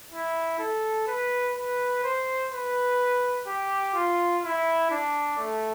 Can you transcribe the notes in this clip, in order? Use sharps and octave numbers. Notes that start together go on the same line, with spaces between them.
E4
A4
B4
B4
C5
B4
G4
F4
E4
D4
A3